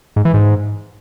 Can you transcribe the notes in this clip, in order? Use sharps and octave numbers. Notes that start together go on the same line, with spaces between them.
G#2
E3
G#2